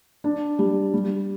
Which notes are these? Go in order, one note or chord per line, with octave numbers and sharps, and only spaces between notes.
D4
G3
G3